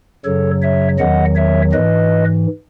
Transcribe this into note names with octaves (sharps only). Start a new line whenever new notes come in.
F#2 C#3 F#3 A4 C#5
C#5 E5
E2 D#3 F#3 D#5 F#5
C#5 E5
G#2 E3 B4 D#5